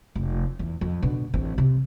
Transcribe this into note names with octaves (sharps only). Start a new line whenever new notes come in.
F1
E2
F2
B2 D3
A1 C4
C3